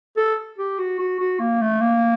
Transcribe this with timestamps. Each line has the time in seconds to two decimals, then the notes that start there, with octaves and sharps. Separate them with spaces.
0.17 A4
0.58 G4
0.78 F#4
0.99 F#4
1.19 F#4
1.39 A#3
1.61 A3
1.81 A#3